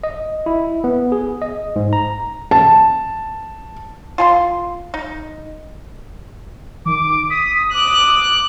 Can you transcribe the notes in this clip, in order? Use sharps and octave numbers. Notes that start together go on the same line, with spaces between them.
D#5
E4
B3
G#4
D#5
G#2
A#5
A5
F4 G#5 C6
D#4
D#3 D6
D#6 B6
D6 F#6